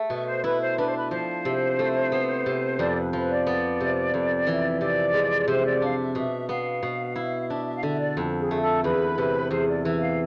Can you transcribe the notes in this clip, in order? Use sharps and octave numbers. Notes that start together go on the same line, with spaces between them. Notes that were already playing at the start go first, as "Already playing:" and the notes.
Already playing: A3
B2 E5
C5
E4 B4
C5
D4 B4
C5
B4
F3 C5
C3
A3
B3
C3
F2 D5
A4
B4
F3 B4
D5
B3
C3
F2
E3
C3 D5
G#3
C3 C5
E5
D5
D4 F5
E5
B2 E5
B3 F5
B2
E4
F5
D4 E5
E5
F5
D3 E5
D5
F2
G#4
A3
A4
E2 B4
C3
E2 C5
D5
E3 E5
F5